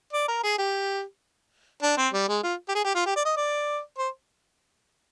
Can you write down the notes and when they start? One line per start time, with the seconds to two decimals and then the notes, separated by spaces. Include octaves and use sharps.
0.13 D5
0.28 A#4
0.43 G#4
0.58 G4
1.82 D4
1.98 C4
2.13 G3
2.28 G#3
2.43 F4
2.69 G4
2.75 G#4
2.85 G4
2.95 F4
3.06 G4
3.16 D5
3.25 D#5
3.37 D5
3.98 C5